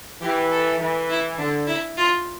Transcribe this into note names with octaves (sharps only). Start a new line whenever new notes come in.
E3 G4
A4
E3
E4
D3 D4
E4
F4